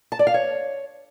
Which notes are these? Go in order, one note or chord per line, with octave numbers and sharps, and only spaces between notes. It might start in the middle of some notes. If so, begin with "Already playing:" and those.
A5
D5
F5
C#5